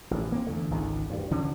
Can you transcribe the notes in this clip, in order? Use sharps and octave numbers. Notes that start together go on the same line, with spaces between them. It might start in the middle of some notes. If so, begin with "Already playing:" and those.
A1
A#3 C4
E2 D3 A3
G#1 C#2 D#3
D2 G2
D2 D3 F#3 C#4